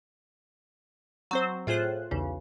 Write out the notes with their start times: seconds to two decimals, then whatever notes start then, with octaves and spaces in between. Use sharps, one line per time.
1.31 F#3 C4 C5
1.67 A2 F4 G#4 C5 F#6
2.11 B1 E2 C#3